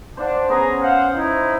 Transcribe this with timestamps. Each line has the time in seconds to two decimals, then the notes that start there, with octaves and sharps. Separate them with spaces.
0.17 D4 C5 F5 F#5
0.49 B3 C#4 G#4 A#5
0.80 C5 F5 F#5
1.15 D#4 E4 C5